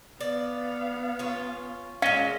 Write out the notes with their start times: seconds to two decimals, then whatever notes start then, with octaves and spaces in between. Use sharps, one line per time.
0.21 B3 D5 F5
1.19 C#4 F4
2.02 A#2 G#3 C#4 D#5 F5